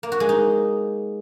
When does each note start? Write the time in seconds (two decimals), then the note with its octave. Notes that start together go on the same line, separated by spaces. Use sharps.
0.03 A#3
0.12 F#4
0.20 G#3
0.29 D#4